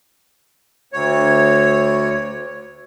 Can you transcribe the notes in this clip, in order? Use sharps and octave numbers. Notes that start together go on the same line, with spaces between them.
D2 C#5